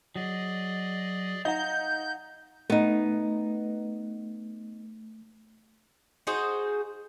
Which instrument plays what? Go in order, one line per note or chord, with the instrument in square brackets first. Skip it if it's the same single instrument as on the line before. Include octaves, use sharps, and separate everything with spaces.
[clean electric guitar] F#3 [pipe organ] G#4 D5 D#5
[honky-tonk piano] D#4 [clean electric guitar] F5 F#5 A#5 [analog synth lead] G6
[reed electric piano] A3 [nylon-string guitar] B3 D#4
[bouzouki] D#4 F#4 G#4 C5